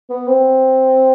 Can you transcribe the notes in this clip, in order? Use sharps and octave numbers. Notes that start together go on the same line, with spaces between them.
B3
C4